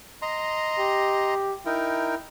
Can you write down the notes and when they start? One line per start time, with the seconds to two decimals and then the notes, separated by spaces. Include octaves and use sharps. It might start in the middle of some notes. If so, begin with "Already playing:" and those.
0.22 D#5 A#5 C6
0.79 G4
1.66 D#4 E4 A#4 G5